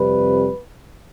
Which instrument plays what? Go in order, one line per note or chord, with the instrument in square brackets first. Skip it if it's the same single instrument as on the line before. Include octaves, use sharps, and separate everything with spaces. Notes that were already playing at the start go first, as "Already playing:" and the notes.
Already playing: [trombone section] F2 C3 G3 B4